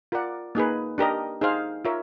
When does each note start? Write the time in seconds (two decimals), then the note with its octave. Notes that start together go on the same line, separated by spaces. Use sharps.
0.12 F4 A#4 D5 F#5
0.55 A#3 D#4 G#4 B4
0.98 D4 G4 A#4 D#5
1.41 D#4 G#4 C5 F5
1.85 F4 A#4 C#5 E5